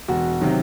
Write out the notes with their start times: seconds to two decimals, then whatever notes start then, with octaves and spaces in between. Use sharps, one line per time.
0.08 E1 F#4
0.41 C3 D#3 F#3